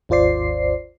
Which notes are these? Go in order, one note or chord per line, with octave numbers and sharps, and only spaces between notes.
G#1 D#2 F4 C5 D5 C7